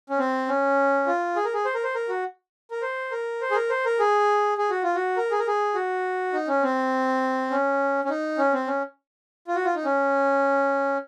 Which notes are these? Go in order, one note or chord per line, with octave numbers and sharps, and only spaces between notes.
C#4
C4
C#4
F4
G#4
A#4
G#4
C5
A#4
C5
A#4
F#4
A#4
C5
A#4
C5
G#4
A#4
C5
A#4
G#4
G#4
F#4
F4
F#4
A#4
G#4
A#4
G#4
F#4
D#4
C#4
C4
C#4
C#4
D#4
C#4
C4
C#4
F4
F#4
F4
D#4
C#4